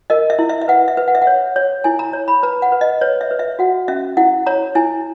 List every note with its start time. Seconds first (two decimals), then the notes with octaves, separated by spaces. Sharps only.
0.10 A#4 D#5
0.30 E5
0.39 E4
0.50 E5
0.62 E5
0.68 B4 F#5
0.88 E5
0.97 B4
1.08 F#5
1.15 E5
1.22 F#5
1.27 C#5
1.56 C#5
1.84 E4 G#5
1.99 A#5
2.13 C#5
2.28 B5
2.43 B4 A#5
2.62 F#5
2.72 B4
2.81 D#5
3.01 B4 C#5
3.21 E5
3.31 B4
3.39 E5
3.59 F#4 F#5
3.88 C#4 E5
4.17 E4 F#5
4.46 C#5 A#5
4.75 E4 G#5